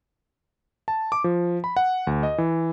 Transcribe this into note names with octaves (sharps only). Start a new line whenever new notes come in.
A5
D6
F3
B5
F#5
D2
D#5
E3